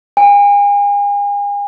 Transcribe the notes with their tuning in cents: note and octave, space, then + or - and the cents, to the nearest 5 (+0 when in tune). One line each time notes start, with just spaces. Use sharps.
G#5 -40